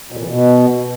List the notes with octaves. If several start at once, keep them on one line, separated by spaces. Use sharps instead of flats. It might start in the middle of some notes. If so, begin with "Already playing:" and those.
B2
A#2
E3
B2